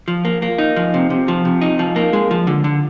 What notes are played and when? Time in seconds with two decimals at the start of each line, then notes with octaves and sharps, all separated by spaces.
0.08 F3
0.25 A#3
0.42 A#3
0.58 D#4
0.76 F3
0.94 C3
1.10 C3
1.28 F3
1.45 C3
1.61 D#4
1.79 F3
1.96 A#3
2.13 G#3
2.31 F3
2.47 D3
2.64 D3